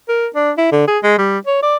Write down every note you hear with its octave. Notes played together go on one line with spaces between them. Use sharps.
A#4
D4
E4
D3
G#4
G#3
G3
C#5
D5